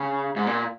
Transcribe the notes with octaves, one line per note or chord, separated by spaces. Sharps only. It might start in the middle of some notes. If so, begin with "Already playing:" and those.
Already playing: C#3
G#2
A#2